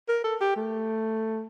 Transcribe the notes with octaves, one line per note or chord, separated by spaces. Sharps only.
A#4
A4
G4
A3